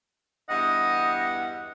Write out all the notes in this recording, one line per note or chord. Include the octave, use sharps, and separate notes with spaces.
E2 G2 D#5 F#5